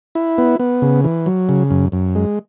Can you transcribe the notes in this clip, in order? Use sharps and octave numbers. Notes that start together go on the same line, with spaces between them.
E4
B3
B3
C#3
E3
F#3
C#3
F#2
F#2
G#3